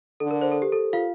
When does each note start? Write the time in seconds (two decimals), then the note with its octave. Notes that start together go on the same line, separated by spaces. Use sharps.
0.20 D3 A4
0.31 A#4
0.41 C5
0.52 A4
0.62 G4
0.72 A4
0.93 F4 F5